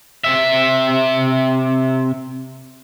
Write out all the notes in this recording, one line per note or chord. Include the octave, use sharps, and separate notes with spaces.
C3 E5